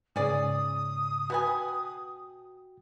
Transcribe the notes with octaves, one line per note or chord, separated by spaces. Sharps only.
G#2 C#3 C#4 G#4 D5 D#6
B2 F#4 B4 G5 G#5